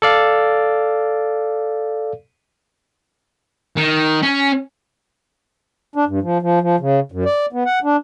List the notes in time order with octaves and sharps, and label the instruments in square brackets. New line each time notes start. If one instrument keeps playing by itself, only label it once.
[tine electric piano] A4 D5 F5
[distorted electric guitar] D#3
C#4
[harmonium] D4
G2
F3
F3
F3
C#3
F#2
D5
B3
F#5
D4